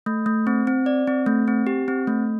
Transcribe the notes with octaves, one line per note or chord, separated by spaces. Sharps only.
A3
A3
C4
C4
D5
C4
A3
C4
G4
C4
A3